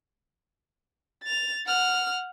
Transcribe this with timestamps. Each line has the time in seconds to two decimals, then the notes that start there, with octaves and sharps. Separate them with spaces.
1.23 A6 F7
1.66 F#5 F6